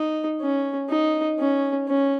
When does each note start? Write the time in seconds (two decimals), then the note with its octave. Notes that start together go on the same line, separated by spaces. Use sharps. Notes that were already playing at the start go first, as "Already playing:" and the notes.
Already playing: D#4
0.41 C#4
0.89 D#4
1.39 C#4
1.88 C#4